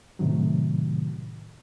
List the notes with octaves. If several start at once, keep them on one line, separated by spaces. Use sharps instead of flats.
A2 C3 D#3 F#3